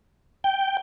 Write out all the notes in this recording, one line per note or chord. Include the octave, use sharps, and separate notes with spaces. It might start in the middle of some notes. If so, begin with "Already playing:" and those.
G5